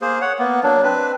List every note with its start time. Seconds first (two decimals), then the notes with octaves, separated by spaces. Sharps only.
0.02 A#3 G#4 C5
0.21 C#5 F#5
0.39 A#3 B3
0.63 F#3 A#3 D4
0.83 C4 D4 B4